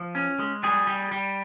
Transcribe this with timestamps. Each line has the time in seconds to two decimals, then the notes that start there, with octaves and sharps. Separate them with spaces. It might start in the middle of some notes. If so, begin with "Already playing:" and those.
Already playing: F3
0.15 C#4
0.39 G#3
0.63 G3 G#4
0.87 G3
1.11 G3